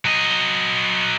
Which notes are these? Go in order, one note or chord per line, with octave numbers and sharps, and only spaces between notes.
F#3 D#5